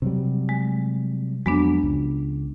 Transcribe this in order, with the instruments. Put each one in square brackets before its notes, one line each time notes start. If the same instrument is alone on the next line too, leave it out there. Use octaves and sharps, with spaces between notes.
[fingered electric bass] C3 F#3 G3
[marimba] G#3
[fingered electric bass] F2 F#3 [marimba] G#3 B3 D4
[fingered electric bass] C#2